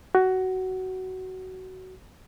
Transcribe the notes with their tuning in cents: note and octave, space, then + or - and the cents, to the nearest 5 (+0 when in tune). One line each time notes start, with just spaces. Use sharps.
F#4 +15